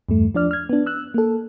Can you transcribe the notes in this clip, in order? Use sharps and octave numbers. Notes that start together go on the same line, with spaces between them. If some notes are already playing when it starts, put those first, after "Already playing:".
E2 G2 A3
F3 D4 D5 F6
F6 G#6
B3 D4
E6 F#6
A#3 A4